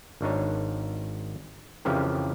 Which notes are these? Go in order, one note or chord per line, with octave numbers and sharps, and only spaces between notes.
G#1 D4 D#4 C#5
F2 C#3 E3 F3 G4 A#4